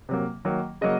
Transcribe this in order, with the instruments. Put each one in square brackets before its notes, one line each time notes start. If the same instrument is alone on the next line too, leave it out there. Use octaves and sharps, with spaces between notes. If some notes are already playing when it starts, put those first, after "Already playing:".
[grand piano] C3 F#3 A#3
D#3 F#3 A#3
C#3 F#3 A#3 D#5